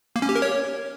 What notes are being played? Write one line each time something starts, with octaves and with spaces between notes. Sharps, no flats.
A#3
C#4
G4
A#4
C#5